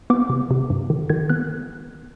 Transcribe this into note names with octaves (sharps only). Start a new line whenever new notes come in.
B3 D6
C3
C3
G2
D#3
D#3 G#6
B3 F#6